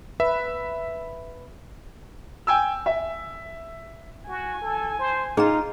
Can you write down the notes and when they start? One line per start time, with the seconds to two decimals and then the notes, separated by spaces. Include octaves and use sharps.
0.20 B4 E5
2.47 G5 G#5 E6
2.86 E5
4.28 F#4 G#5
4.61 A4
4.99 C5
5.37 D#4 F4 G#4 A#5